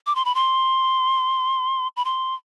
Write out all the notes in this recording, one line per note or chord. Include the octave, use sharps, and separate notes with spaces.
D6
C6
B5
C6
B5
C6